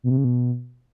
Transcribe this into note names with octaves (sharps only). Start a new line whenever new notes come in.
B2
C3
C#3
B2